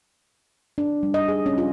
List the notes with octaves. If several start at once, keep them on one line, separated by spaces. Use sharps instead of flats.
D4
G3
D#5
G#4
C#4
F4